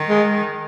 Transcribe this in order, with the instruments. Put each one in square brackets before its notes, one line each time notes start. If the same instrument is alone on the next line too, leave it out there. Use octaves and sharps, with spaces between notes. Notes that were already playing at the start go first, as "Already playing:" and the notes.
Already playing: [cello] D#3
[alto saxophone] G#3